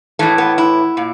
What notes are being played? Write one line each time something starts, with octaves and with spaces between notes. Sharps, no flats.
A2 E3 A3
B3
E4
A#2